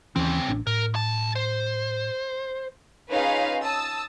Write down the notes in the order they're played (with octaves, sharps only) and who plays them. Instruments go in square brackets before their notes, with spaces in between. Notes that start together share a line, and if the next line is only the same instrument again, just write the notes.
[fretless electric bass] D#2 E3 C#4 [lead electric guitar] C#3 C4
[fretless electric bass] A1 D4
[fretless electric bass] A2 [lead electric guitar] A#4
[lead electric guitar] B1 A5
C5
[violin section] C#4 D#4 F4 G#4 B4 F5
A5 D#6 E6